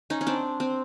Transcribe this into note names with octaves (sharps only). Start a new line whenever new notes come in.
C#4 D#4
C#4
C4 D4
C4